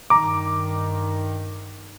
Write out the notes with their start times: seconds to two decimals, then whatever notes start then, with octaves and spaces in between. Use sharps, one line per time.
0.10 G2 D#3 A#5 D6